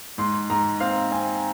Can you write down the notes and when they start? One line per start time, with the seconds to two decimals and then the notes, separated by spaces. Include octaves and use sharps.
0.18 G#2 C6
0.50 G#2 A#5
0.80 C4 F5
1.11 C4 G#5